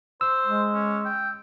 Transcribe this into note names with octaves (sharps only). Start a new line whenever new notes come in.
C5 E6
G#3
C#4
G5